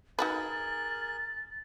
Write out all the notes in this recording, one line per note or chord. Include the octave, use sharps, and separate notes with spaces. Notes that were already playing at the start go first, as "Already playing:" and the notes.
D#4 F#4 G#4 A#4 B4 F#6 A6